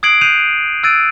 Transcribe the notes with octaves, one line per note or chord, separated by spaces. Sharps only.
D#6 F#6 G#6 C7 D7 F#7
F#6 G6 C7 D#7 F7
E6 F#6 G#6 A6 D7 D#7